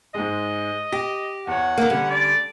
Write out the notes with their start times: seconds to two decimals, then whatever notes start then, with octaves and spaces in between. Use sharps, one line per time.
0.15 G#2 G#3 D#5
0.92 G4 A#6
1.47 E2 C#5 F#5
1.78 D#3 A#3 F5
1.90 D3 G3 C#4
2.10 D5